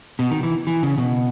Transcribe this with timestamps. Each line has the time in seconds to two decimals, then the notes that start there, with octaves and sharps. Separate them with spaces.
0.19 B2
0.31 D#3
0.43 E3
0.67 E3
0.83 C#3
0.98 B2